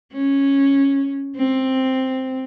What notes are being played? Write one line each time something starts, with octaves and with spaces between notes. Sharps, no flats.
C#4
C4